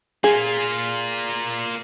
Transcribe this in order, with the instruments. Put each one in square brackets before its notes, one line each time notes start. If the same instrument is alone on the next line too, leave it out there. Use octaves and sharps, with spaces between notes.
[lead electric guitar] A#3 F4 [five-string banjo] G#4